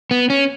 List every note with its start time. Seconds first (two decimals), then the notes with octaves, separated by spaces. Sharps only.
0.11 B3
0.30 C#4